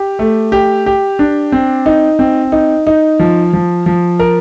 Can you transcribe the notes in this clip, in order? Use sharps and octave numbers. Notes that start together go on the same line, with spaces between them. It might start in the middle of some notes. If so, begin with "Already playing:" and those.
Already playing: G4
A3
G4
G4
D4
C4
D#4
C4
D#4
D#4
F3
F3
F3
A#4